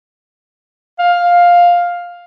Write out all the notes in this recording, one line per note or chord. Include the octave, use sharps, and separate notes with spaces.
F5